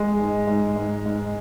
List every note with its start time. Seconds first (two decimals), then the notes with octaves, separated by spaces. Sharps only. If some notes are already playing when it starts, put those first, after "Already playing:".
Already playing: G#3
0.19 G#2
0.47 G#2
0.76 G#2
1.06 G#2